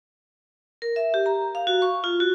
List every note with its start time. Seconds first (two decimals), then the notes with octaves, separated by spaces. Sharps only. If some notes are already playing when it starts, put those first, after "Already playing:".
0.82 A#4
0.96 E5
1.14 G4
1.26 A#5
1.55 F5
1.67 F#4
1.82 C#6
2.04 F4
2.20 F#4